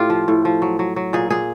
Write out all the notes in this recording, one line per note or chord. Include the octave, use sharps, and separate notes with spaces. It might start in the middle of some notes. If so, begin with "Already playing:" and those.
Already playing: A2 F4 G4
F3
A2
F3
F#3
F#3
F#3
A#2 G#4
A#2 G#4